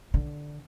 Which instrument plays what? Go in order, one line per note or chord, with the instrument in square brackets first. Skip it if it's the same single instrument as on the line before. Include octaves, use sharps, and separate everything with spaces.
[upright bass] D3